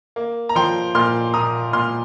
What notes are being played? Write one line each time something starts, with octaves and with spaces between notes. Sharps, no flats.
A#3
A#5
F3 G5 C6
A#2 C6 F6
A#2 A#5 D#6
A#2 C6 F6